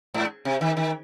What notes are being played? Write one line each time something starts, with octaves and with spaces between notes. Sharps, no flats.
G#2
C3
D#3
D#3